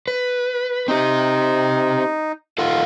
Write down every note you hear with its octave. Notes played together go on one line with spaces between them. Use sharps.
B4
C4 D#4 G4
D#3 F4 A4 F5 F#5